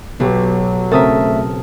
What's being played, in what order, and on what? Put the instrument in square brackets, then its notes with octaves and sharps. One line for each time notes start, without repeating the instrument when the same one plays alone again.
[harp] B1 [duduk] F#3 [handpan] B3 G4
[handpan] C#3 C4 A#4 [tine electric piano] A3 E5 [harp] A5 D#6